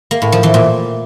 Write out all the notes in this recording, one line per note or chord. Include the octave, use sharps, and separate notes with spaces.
A#3
A2
F3
E3
A#2